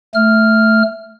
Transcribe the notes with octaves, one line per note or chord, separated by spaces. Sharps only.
A3 F6